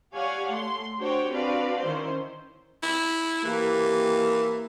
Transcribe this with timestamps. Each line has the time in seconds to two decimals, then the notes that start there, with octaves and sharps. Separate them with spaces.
0.15 G4 C#5 D5 F5 F#5 G#5
0.52 A3 C6
1.00 D4 F#4 G4 C5 C#5 G5
1.31 C4 D4 F#4 B4 D5 F5
1.82 D#3 C#4 E4 C5
2.83 E4
3.45 E3 A#3 G4